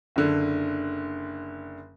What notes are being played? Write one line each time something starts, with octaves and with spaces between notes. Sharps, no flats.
F#1 D3